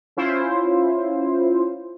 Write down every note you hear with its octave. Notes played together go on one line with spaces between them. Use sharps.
C#4 E4 F4 C5